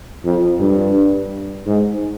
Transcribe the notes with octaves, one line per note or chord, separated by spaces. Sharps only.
F2
G2
G#2